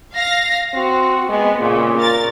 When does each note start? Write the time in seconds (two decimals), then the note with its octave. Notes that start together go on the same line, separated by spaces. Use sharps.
0.15 F5 A#6
0.74 C4 F#4
1.29 G#3 B3
1.61 A#2 C#3
1.98 A#4 A6